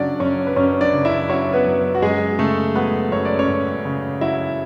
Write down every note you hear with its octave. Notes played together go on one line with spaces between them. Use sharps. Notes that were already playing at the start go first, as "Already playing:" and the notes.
Already playing: F#2 C#3 F#3 C#4 D4 C#5 D5
F#2 C#4 C#5
B4
F#2 C#4 C#5
D4 D5
C#3
E4 E5
F#3 C#4 C#5
B3 B4
F#2
F#4
F#2 G#3 G#4
C#3 A3 A4
F#3 B3 B4
F#2 C#5
D5
C#4 C#5
F#2
C#3
F#3 E4 E5